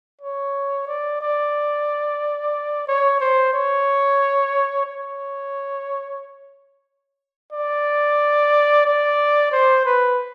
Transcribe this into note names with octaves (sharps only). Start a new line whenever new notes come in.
C#5
D5
D5
C#5
C5
C#5
C#5
D5
D5
C5
B4